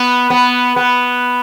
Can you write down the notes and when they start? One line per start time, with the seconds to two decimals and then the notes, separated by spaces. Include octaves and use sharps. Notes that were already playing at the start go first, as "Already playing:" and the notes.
Already playing: B3
0.30 B3
0.76 B3